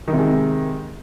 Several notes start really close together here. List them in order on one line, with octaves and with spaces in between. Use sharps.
D#3 C3 G#3